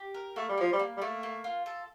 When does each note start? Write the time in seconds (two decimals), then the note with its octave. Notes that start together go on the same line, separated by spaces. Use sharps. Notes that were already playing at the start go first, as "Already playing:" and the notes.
Already playing: G4
0.14 A#4
0.36 A3 A#3
0.49 G3
0.58 F3 A#3
0.73 G3
0.79 A#3
0.97 G3
1.01 A3 A#3
1.23 A#3
1.44 F4
1.66 A4